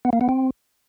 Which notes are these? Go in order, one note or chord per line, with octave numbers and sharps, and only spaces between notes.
B3
A#3
B3
C4